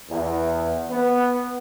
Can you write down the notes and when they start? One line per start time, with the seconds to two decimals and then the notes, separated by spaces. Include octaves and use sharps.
0.10 E2
0.90 B3